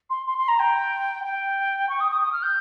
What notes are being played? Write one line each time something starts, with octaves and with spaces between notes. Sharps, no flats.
C6
C6
C6
A#5
G5
G5
C#6
D#6
D#6
D#6
F6
G6